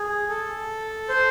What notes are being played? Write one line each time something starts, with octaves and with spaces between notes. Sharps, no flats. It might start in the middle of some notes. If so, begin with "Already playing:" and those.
Already playing: G#4
A4
C5